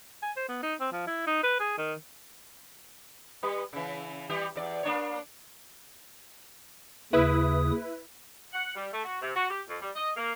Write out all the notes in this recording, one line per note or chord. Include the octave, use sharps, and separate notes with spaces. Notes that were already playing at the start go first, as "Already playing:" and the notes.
G#5
C5
B3
D#4
C4
F3
E4
D#4
B4
G#4
D#3
G3 B4
C#3 E3
E3 G3 G4
E2 D5
A#3 D4 C#5
D#2 C#3 E4 B4 D#6
F#5
G3
A3
F#4
C3
F#4
G4
F2
G3
D#5
A#3